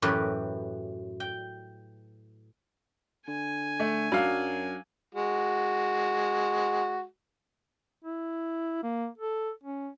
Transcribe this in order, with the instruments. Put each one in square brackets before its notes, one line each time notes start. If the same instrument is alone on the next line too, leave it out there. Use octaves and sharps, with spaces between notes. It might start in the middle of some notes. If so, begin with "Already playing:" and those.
[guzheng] F#2 A2 E3 G4 A#4 B4
G5
[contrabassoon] D3 [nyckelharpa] G#5
[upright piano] A3
[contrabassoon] F#2 [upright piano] F#3 D4 F5
[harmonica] G#3 F#4
[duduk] E4
A#3
A4
C#4